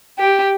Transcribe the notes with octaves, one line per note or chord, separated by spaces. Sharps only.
G4